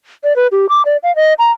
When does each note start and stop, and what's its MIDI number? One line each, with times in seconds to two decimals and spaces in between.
0.24 0.35 74
0.36 0.47 71
0.51 0.66 67
0.69 0.82 86
0.85 0.97 74
1.03 1.14 77
1.16 1.34 75
1.39 1.51 82